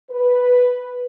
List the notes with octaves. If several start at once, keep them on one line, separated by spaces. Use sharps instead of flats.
B4